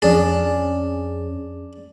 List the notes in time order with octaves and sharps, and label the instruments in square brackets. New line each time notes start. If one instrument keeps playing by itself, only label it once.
[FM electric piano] F2 C#4 G#4 [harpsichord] D4